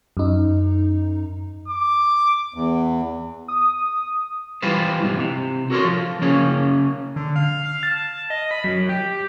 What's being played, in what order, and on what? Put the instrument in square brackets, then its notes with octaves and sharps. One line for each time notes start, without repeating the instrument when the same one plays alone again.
[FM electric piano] F#2 D#4
[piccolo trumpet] D6
[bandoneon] E2
[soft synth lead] D#6
[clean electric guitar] E3 G3 F4 B4 C5
G#2 C3 E3
C3
F#4 A4 A#4 C#5 C6
F3
C#3 A#3 C#4 G#4
[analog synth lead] D3
F5
F5
A5
D#5
B5
F#2
G4